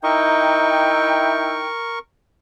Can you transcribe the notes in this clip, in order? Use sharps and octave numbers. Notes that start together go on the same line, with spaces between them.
D#4 E4 A#4 E5 G5 C#6